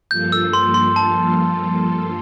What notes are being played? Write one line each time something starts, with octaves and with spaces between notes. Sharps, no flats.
G2 F3 A#3 F4 A4 G6
E6
C6
C6
A5